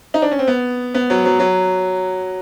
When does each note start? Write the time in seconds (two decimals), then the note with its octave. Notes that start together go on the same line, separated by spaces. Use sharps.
0.14 D#4
0.22 D4
0.31 C#4
0.39 C4
0.47 B3
0.94 B3
1.10 F#3
1.25 F#3
1.40 F#3